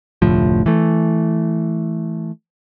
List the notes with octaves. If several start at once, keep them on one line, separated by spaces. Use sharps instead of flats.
F1 D2 A2 F3
E3 A3